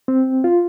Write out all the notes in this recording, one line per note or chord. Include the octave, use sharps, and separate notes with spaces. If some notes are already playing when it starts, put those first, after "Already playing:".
C4
F4